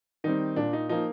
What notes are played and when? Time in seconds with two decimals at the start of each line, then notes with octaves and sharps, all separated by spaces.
0.24 D#3 G3 C4 D#4
0.56 A#2 D4
0.73 D#4
0.89 F3 A#3 D#4